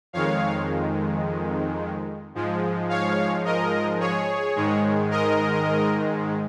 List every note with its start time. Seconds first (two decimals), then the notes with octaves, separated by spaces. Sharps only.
0.13 F2 D#3 G#3 C#5 F5
2.34 G#2 F3 G#3
2.89 C#5 F5
3.45 A#4 D#5
4.00 G#4 C#5
4.55 G#2 D#3 G#3
5.11 A#4 D#5